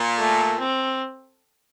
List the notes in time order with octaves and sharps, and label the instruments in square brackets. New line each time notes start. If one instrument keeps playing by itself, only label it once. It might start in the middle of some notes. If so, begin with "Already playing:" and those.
Already playing: [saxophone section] A#2
[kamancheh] A3
C4